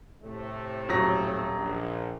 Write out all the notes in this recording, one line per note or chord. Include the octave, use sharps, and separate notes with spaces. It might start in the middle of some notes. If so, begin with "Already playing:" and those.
A2 C3 A3
D#1 F#3 A#6
A#1